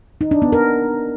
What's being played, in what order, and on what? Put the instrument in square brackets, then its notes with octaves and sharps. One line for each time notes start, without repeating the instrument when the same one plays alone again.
[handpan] D#4
D4
B3
A#4